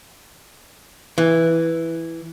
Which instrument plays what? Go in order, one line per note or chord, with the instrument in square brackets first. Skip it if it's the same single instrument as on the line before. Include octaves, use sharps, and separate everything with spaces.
[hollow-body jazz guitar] E3